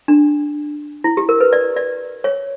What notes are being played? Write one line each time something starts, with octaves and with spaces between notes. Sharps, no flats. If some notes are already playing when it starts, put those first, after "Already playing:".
D4
E4
G4
A#4
B4
D5
D5
C#5